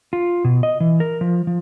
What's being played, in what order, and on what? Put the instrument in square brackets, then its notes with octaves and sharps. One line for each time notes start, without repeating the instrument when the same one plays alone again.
[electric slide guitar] F4
B2
D#5
E3
A#4
F3
F3